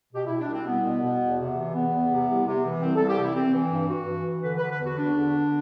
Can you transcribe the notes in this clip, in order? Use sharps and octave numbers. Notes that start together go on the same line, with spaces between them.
B2 G4
E4
B2
D4
C2 C4
C2 B3
B2
B2
E2
C3
E3
E2 B3
E2
C3
C2
C3
E3
C2 C4
A4
C2
G4
C3 E4
E3 C4
E3
G2
G2 F#4
E3
E3
D3 B4
B4
D3
B4
E2 F#4
E2 D4
D3
D3